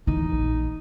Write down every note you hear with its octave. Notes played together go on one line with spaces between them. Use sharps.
E3 D#4
A#1